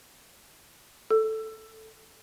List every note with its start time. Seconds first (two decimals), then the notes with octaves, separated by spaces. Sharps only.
1.10 A4